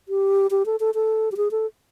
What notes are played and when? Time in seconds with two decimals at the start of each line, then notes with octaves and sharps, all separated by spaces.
0.09 G4
0.51 G4
0.66 A4
0.80 A4
0.95 A4
1.32 G4
1.37 G#4
1.51 A4